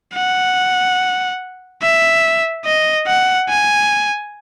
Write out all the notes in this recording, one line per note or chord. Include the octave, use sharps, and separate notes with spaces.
F#5
E5
D#5
F#5
G#5